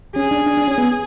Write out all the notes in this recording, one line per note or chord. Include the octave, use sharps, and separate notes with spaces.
C#4 G#4
D4
D4
D4
C#4
B3